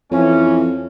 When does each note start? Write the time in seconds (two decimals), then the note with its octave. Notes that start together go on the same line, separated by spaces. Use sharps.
0.11 F2 E3 C#4